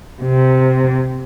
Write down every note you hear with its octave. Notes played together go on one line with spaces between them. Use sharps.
C3